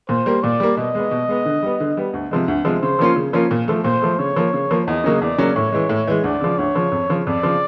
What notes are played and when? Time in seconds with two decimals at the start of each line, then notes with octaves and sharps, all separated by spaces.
0.09 A#2 C5
0.26 G3 A#3
0.43 A#2 D5
0.60 G3 A#3
0.77 B2 D#5
0.95 G#3 B3
1.11 B2
1.28 G#3 B3
1.45 D3
1.63 G3 B3
1.80 D3
1.97 G3 B3
2.14 D2
2.31 C3 F3 G#3
2.48 D2
2.65 C3 F3 G#3
2.82 C#3 C5
2.99 F3 A#3 C#4 F4
3.16 C#3
3.33 F3 A#3 C#4 F4
3.51 A#2
3.68 F3 A3
3.84 A#2 C5
4.02 F3 A3
4.19 C#3 C#5
4.36 F3 A#3
4.53 C#3
4.71 F3 A#3
4.87 E2 D#5
5.04 C#3 F#3 A#3 C#4
5.22 E2 D5
5.38 C#3 F#3 A#3 C#4
5.56 A2 C#5
5.72 E3 G#3
5.89 A2
6.07 E3 G#3
6.24 D2 D5
6.41 C#3 F3
6.58 D2 C#5
6.75 C#3 F3
6.92 F2
7.10 C#3 F3
7.27 F2 D5
7.43 C#3 F3